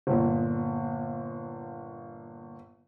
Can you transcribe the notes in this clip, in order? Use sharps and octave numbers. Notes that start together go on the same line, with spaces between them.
G1 A#2